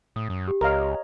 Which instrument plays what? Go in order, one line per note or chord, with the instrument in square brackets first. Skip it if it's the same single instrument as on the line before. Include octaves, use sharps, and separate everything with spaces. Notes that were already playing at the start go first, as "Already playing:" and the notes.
[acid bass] A2 [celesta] D#6
[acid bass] F#2
[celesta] G4
[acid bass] C#2 [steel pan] A#4 F5 [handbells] C#5 D#5 A#5